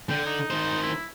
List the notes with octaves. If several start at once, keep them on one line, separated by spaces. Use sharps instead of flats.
D3 G5
D#4
D#3 C5
E4